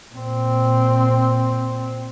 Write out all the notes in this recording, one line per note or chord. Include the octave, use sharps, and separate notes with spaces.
A#2 C4